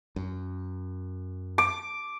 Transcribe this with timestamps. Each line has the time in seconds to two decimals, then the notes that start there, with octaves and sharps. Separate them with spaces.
0.16 F#2
1.58 D6